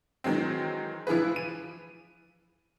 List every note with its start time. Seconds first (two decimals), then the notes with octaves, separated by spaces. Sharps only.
0.24 D#3 E3 F#3 G#3 C4
1.07 E3 F3 E4 G#4 B4
1.36 D#7